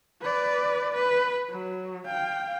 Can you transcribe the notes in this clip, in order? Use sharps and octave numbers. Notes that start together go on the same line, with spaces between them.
B4 D5
B4
F#3
F5 G5